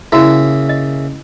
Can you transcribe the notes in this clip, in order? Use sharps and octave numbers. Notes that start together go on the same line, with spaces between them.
C#3 A#3 E4 F#4 E5
D#5